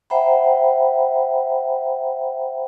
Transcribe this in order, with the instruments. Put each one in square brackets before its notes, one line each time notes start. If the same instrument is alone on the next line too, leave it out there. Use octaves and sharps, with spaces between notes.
[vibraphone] C5 E5 F#5 G5 A#5 B5